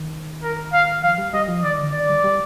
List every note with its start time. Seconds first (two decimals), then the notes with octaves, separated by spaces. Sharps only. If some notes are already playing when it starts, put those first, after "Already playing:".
Already playing: D#3
0.43 A#4
0.73 F5
1.03 F3 F5
1.18 G3
1.34 G3 D#5
1.48 F3
1.63 D#3 D5
1.78 D3
1.93 D#3 D5
2.09 G3
2.24 G3